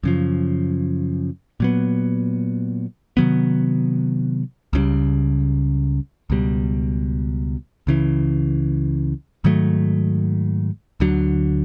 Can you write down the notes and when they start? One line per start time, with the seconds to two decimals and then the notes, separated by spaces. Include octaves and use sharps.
0.03 F#2 C#3 F3
1.60 A#2 F#3 B3
3.17 C3 D#3 F#3 B3
4.73 C#2 C#3 E3 G3
6.30 C#2 B2 G3
7.87 C#2 C#3 E3
9.44 G#2 D#3 F#3 A3
11.00 D2 D3 F#3